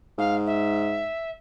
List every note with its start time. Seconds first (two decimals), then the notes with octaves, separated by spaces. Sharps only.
0.18 G#2 F5
0.46 E5